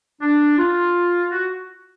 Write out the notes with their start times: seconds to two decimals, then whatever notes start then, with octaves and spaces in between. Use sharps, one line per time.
0.22 D4
0.58 F4
1.31 F#4